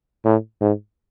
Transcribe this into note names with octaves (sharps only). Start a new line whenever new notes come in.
A2
G#2